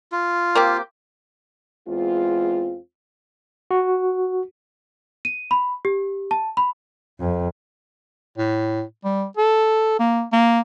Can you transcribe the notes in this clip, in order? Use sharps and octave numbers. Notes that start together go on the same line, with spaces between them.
F4
A#3 C4 G4
E2 G#3 C4 F4
F#4
D#7
B5
G4
A5
B5
F2
A2
G3
A4
A#3
A#3